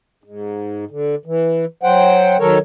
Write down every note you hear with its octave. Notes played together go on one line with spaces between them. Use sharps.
G#2
D3
E3
F#3 C5 F#5 G5
D#3 F#3 A4 A#4 C#5